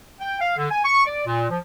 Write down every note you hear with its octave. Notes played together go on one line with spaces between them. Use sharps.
G5
F5
D3
G#5
C#6
D5
A#2
F3